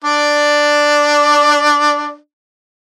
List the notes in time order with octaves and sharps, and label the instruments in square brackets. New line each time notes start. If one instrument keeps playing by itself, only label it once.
[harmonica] D4 D5